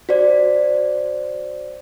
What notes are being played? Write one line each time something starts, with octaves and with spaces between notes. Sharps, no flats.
F#4 C5 D5